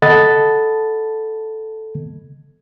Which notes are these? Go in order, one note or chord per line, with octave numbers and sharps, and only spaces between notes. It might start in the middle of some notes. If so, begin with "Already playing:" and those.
A4 D#5 F#5 A5 B5 A6